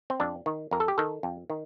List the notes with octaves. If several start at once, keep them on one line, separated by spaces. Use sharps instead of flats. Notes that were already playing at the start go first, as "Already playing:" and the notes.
C4
F2 D4
D#3
F2 A#4
A4
G4
D#3 A4
F2
D#3